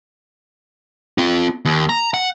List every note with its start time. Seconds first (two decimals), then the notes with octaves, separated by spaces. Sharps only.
1.18 C4 F4
1.65 D#2
1.89 A#5
2.14 F#5